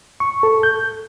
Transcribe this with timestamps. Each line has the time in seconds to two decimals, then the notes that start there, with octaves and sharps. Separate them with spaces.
0.20 C#6
0.43 A4
0.63 G6